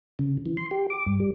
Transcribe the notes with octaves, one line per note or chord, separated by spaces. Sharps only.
C#3
E3
C6
G4
D6
G2
G3